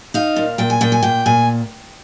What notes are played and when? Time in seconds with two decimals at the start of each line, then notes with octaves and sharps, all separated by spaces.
0.14 D#4 F5
0.36 A#2
0.58 A#2 G5
0.70 G#5
0.81 A#2 G5
0.92 G#5
1.03 A#2 G5
1.26 A#2 G#5